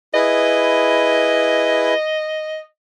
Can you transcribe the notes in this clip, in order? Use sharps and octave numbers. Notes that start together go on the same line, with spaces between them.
E4 G#4 B4 D#5